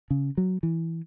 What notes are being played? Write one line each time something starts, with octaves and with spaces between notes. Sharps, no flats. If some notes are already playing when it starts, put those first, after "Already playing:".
C#3
F#3
E3